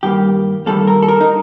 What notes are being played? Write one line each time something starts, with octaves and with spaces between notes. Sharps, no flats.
G2 D#3 G3 A#3 G4
G2 D#3 G3 A#3 A4
A#4
A4
A#4
D#4